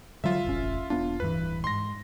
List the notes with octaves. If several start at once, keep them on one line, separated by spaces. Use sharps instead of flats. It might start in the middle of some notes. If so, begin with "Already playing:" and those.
D3 F#3 G3 F4 E5
E1 A1 C#4
E1 B3 D4 F4
D1 G2 E3 B4
G#2 C6 A#6